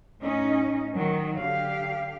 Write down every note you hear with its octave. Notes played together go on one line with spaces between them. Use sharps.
A2 C#4 D#4 D#5
D#3 F#3
D3 G4 F5